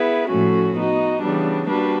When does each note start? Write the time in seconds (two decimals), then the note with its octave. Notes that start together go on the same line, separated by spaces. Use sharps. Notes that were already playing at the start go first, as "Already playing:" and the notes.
Already playing: B3 E4 G#4 B4
0.28 A2 F3 A3 C#4 F#4
0.74 B3 D#4 F#4
1.21 C#3 E3 G3 B3 D4
1.68 G3 A#3 D4 F#4 B4